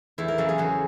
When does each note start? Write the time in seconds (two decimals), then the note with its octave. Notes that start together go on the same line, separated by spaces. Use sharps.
0.18 E2 E4
0.28 A#4
0.38 C#3 F#3 A4
0.49 G#4
0.58 E2 F#4